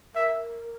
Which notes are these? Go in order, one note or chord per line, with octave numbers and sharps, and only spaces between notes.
A#4 E5